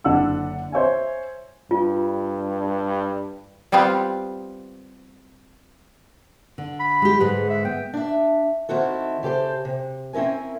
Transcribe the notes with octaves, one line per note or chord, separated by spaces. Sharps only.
F#1 D3 D4 F#5 E6
C5 C#5 E5 G#5
G2 F4
G3 B3 C4 F4 G4
D3
B5
G#3 G4
G#2 D3 G#3 B4
E5
B3 G5
D4 E5
D#3 C4 E4 F#4 A4
C#3 G4 A4 C5
C3
C4 C#4 E4 A#4 G#5